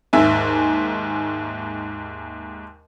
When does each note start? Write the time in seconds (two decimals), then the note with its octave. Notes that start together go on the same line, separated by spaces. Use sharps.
0.13 D#2 G#2 E5 G#5